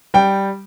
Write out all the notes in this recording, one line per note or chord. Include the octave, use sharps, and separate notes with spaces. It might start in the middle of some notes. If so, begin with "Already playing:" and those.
G3 G5